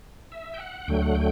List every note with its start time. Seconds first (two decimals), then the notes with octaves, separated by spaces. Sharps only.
0.32 E5
0.54 G5
0.60 F#5
0.87 D2 D3 F#3 A3 G5
1.02 F#5
1.15 G5